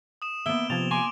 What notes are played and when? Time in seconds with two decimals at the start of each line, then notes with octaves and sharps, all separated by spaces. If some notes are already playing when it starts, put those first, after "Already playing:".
0.22 D#6 E7
0.46 A#3 B3 E5 D7 G7
0.70 C3 F3 C4 G#6 A6 F7
0.91 G#5 A#5 C6 D6